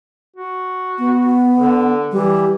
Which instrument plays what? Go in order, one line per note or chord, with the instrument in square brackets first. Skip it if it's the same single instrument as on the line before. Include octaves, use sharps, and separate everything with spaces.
[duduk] F#4
[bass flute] B3
[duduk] D3
[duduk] E3 [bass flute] G3